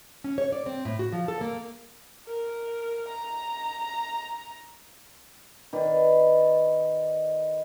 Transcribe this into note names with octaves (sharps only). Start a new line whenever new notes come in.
C#4
C#5
D5
C4
A2
F#4
F3
A4
A#3
A#4
A#5
D#3 B4 D5